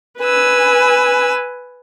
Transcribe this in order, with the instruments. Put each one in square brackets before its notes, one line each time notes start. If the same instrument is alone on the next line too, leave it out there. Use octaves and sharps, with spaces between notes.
[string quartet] B4 G#5 E6